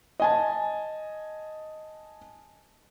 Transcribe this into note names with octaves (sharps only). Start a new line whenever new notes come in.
D#5 G#5 A5